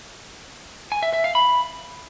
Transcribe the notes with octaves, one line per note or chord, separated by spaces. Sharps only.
G#5
E5
E5
F5
B5